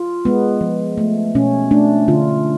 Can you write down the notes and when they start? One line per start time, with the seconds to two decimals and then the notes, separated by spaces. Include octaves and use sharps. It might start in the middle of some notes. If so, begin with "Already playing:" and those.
Already playing: F4
0.25 G#3 B3
0.61 F3
0.97 A3
1.35 B2 C#4
1.71 A3 D4
2.08 D3 F4